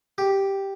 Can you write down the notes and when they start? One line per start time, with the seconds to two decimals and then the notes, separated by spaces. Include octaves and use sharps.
0.18 G4